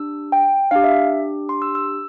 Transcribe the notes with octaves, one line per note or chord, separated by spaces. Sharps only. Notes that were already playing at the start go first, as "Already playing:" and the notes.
Already playing: D4 G4 E6
G5
D4 G4 F5
E5
C6
E6
E6